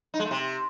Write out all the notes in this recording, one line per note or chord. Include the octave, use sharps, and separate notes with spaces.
D#4
G#3
A3
C3